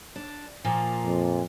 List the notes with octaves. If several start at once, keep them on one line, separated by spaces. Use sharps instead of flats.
D4
A#2 F3 A#3
F2